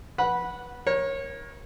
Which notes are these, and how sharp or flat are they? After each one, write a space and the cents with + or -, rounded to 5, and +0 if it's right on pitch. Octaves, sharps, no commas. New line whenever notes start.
B4 -15 F#5 +0 B5 -15
A#4 +25 C#5 -20